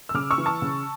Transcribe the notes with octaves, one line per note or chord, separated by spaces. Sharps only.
E6
C#3 D6 F6
C#6 E6
E3
A5 C#6
C#3